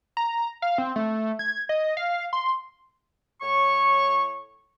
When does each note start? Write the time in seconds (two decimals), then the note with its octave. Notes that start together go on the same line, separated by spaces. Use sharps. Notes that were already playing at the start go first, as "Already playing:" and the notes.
0.17 A#5
0.62 F5
0.78 C4
0.96 A3
1.39 G#6
1.69 D#5
1.97 F5
2.33 C6
3.42 A2 C#5 C#6